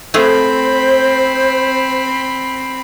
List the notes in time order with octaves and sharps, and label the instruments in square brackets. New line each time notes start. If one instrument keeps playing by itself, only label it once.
[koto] A3 F4 G#4 [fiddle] C4 B5 [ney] C5